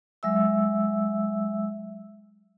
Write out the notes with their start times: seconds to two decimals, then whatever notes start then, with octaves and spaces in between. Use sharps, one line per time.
0.23 F#3 G#3 E5 E6